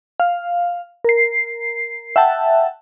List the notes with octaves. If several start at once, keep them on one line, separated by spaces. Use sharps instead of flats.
F5
A#4 C7
E5 F#5 G5 A5